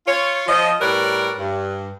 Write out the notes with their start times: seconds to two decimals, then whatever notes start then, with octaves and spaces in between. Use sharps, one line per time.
0.07 F4 C#5
0.48 F3 D#5
0.81 A2 G3 A#4 B4 C#5 D5
1.39 G2